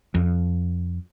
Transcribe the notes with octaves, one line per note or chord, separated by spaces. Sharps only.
F2